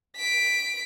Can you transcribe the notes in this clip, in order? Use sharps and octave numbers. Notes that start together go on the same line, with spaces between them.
B6 D7